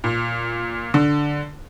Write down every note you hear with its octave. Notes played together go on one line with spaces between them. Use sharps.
A#2
D3